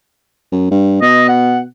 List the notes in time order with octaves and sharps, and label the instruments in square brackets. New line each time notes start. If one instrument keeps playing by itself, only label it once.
[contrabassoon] F#2
G2
[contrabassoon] B2 [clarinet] D#5
[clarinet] F#5